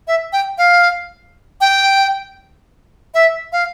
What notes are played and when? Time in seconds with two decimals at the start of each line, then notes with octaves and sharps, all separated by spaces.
0.08 E5
0.33 G5
0.58 F5
1.61 G5
3.14 E5
3.52 F5